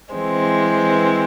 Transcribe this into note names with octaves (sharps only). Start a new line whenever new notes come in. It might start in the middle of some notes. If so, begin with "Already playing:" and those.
E3 G#3 C4